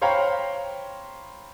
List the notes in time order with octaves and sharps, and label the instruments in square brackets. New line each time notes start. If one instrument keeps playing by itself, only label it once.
[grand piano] C5 C#5 F5 G5 A#5 B5